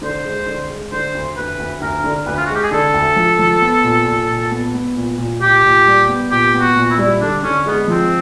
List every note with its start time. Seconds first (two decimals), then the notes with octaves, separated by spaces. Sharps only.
0.02 D3 C5
0.25 G#3
0.46 D3
0.69 G#3
0.92 D3 C5
1.15 D2
1.37 D2 B4
1.59 D2
1.81 D2 A#4
2.04 D3
2.26 D2 B4
2.37 F4
2.46 G#3 F#4
2.55 G4
2.63 G#4
2.71 D3 A4
2.94 D2
3.16 F3
3.39 F3
3.61 B3
3.84 A#2
4.06 A#2
4.29 A#2
4.51 B3
4.74 B3
4.96 A#2
5.18 A#2
5.41 A#2 G4
5.64 A#2
5.86 G3
6.08 B3
6.31 A#2 G4
6.54 B3
6.61 F#4
6.76 A#2
6.91 E4
6.98 G3
7.21 D3 D4
7.43 D3 C#4
7.66 G#3 B3
7.88 F3 C4